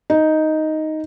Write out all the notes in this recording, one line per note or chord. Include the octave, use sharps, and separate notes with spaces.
D#4